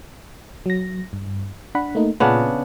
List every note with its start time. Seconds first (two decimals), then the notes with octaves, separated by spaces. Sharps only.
0.66 F#3 A#6
1.13 G2
1.75 D4 F#5 B5
1.95 A3 A#3 D#4
2.20 A#2 C#3 B3 D4 F4